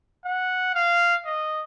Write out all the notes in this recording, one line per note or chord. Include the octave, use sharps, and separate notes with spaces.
F#5
F5
D#5